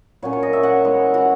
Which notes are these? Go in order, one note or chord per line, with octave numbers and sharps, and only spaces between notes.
A#2 F#3 A#3 C#4 C#5
C#5
D#5
E5
F#5
E3 G#3 B3
F#4